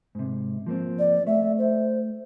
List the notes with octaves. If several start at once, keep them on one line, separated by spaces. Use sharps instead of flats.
G#2 C3
F3 A#3 C4
D5
A3 E5
C5